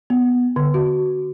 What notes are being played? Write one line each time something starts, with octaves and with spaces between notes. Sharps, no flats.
B3
D3
F#4